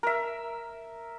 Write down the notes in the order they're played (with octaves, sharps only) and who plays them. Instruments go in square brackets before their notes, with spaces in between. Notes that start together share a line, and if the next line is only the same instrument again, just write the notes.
[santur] A#4 E5